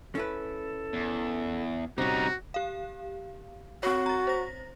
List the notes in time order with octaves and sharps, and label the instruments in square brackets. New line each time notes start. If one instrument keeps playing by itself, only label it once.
[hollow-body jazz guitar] C#4 E4 B4 [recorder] A4
[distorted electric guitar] E2
[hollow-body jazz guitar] C3 C#4 [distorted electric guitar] G3 D#4 [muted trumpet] F#4 [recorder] A#5
[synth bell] G4 F5
[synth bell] C4 C#5 [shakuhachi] F#4
[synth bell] A#5 A6
C5 A#6